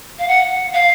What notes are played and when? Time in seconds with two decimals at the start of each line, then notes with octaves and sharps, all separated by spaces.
0.19 F5
0.28 F#5
0.74 F5